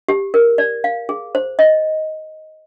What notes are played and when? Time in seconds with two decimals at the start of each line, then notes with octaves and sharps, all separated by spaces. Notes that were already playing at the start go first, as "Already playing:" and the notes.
0.08 G4
0.34 A#4
0.58 D5
0.84 F5
1.09 G#4
1.35 C5
1.59 D#5